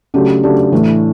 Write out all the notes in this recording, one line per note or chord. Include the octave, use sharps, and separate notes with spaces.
C#3 F#3 A3 D4 G4
C#3 F#3 A3 D4 G4
A2 E3 A3 D4